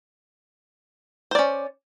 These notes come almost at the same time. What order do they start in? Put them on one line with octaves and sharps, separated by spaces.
C5 D5 C#4